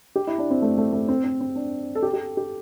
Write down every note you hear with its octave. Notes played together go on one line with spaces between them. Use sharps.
G4
E4
D4
C4
A3
A3
A3
C4
C4
C4
D4
A4
G4
A4
G4
G4